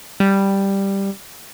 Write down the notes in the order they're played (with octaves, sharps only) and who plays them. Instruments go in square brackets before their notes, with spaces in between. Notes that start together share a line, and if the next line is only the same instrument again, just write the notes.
[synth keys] G3